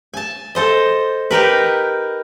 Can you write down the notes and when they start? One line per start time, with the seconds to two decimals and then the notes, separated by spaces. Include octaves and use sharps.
0.14 G#5 A5
0.55 A4 C5 D#5
1.31 D#4 G4 A#4 B4